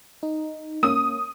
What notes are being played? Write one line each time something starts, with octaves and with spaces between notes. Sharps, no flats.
D#4
A#3 C#4 D#6